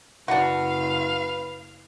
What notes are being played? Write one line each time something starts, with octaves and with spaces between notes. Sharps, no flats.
F#1 D4 F#4 B4 F5